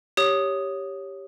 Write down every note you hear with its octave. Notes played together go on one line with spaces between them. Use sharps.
G4 C#5 D#6